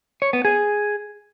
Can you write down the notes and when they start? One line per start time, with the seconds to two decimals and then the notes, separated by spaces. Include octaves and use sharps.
0.22 C#5
0.33 B3
0.45 G#4